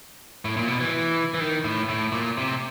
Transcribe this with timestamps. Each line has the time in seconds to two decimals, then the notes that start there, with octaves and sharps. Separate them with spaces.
0.45 A2
0.57 A#2
0.68 B2
0.80 E3
1.34 E3
1.40 D#3
1.64 A2
1.89 A2
2.12 A#2
2.37 C3